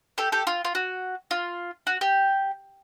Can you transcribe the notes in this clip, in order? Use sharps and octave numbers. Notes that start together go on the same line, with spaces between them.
G4 A4
G4 A4
F4
F4
F#4
F4
F#4
G4